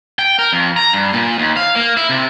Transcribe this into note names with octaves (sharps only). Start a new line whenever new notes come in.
G5
A#4
F2
A#5
G2
A#2
D#2
F5
A#3
E4
C3